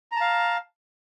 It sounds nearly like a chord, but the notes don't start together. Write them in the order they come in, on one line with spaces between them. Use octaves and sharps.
A#5 A5 F5